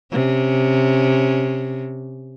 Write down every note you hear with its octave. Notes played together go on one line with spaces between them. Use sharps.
C3 C#4